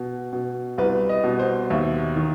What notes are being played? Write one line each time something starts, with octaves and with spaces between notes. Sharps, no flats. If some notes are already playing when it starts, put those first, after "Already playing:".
Already playing: B2
B2
C2 B4
D#5
B2
C5
D#2 E5
D#3